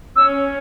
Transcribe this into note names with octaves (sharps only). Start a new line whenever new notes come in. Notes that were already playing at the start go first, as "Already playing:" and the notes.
C#4 E6